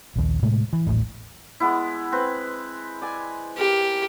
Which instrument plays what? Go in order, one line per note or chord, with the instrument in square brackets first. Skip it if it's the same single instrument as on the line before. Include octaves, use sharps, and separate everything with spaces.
[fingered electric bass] A#1 D#2
A2 C3 G#3 A3
E3
D#1 A1 A2
[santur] G#3 B3 E4
C4 B4
D5 G#5
[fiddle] G4 [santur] A#4